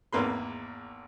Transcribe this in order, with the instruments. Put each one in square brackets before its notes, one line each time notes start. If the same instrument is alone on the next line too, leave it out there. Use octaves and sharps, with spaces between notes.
[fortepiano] G#1 E2 A#3 B4 C6